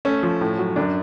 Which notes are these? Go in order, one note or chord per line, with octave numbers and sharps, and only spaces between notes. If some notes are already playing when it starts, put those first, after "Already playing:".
A3 C#4
F3
A2
F#3
F#2 D4